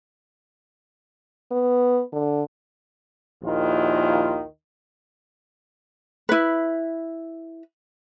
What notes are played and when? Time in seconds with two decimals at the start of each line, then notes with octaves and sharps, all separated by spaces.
1.51 B3
2.13 D3
3.43 A#1 D#2 D#3 E4 F4
6.29 E4 B4